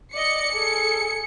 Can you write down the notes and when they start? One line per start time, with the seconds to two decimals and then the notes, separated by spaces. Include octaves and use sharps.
0.14 D5 D#5 C#7
0.52 G#4 A4